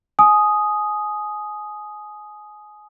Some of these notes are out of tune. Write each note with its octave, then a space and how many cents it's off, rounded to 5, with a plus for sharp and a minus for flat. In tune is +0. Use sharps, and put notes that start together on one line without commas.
G#5 +25 D#6 +0